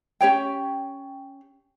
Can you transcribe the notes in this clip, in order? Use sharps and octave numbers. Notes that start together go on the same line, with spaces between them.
C#4 G4 C#5 G5